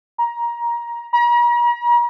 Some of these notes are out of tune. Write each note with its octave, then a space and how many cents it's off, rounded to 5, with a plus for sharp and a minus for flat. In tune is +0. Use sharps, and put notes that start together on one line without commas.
A#5 +20
A#5 +45